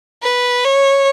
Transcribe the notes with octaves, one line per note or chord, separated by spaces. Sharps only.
B4
C#5